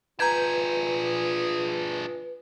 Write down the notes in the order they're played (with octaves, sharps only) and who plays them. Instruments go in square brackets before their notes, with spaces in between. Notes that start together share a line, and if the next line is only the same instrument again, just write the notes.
[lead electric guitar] D4 G#4 [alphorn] F4 [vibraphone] B4 [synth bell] A#5 G6 G#6